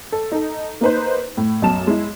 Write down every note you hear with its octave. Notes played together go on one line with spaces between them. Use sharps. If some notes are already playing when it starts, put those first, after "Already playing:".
A4
D#4 A4
A#3 D#4 B4 C5
A2
B1 F#2 A5 E7
G#3 E4